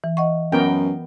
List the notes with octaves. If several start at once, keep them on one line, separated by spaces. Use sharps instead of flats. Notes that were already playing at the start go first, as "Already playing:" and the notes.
E3
D#5 F#5 C#6
F#2 B3 A#4 G5